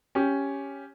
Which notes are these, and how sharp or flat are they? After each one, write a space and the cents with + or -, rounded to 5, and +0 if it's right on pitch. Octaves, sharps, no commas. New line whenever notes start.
C#4 +0 G4 +0